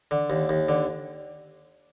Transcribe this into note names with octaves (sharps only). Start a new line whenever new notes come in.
D3
D#2
D#2
D3